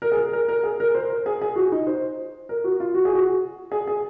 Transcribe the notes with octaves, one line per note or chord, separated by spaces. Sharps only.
A#4
G#4
A#4
A#4
A#4
G#4
A#4
C5
A#4
G#4
G#4
F#4
D#4
C5
A#4
F#4
F4
F#4
G#4
F#4
G#4
G#4